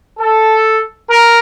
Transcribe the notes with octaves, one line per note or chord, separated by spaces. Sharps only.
A4
A#4